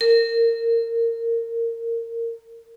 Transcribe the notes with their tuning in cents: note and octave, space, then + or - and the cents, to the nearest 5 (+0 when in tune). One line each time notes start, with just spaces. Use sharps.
A#4 -20